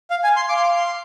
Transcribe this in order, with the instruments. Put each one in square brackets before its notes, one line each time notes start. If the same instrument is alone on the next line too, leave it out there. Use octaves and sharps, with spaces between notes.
[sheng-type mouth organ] F5
G#5
C6
[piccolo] F5 [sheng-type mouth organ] D6
[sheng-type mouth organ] C6
D6
C6